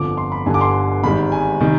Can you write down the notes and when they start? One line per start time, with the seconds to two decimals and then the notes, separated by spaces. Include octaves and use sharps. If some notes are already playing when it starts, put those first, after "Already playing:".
Already playing: G1 F2 D3 F3 D6
0.17 C6
0.32 B5
0.46 G1 G2 D3 G3 G#5
0.54 D6
0.61 C6
1.03 G#1 G#2 D#3 G3 B5
1.32 G#5
1.61 C3 D#3 G3